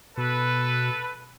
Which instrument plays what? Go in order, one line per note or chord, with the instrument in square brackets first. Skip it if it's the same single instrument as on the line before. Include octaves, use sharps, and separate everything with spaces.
[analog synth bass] B2 [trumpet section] A4 B4